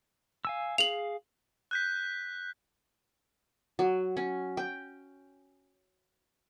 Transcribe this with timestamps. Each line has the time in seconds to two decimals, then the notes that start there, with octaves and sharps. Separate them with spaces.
0.45 F5 G#5 E6
0.78 G#4 F5 F7 F#7
1.71 F#6 G6 B6
3.79 F#3
4.17 C#4
4.57 G5